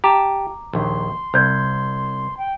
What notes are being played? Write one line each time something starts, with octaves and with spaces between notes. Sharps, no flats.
G4 A5 A#5 D6
A#1 D#2 C6
C2 C5 G6 G#6
G5